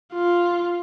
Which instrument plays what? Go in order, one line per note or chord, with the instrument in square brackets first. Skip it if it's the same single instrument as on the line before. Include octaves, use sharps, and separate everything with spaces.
[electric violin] F4